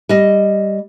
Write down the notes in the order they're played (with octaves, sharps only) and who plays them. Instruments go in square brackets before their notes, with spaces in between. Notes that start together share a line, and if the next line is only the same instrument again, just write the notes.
[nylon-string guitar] G3 D#5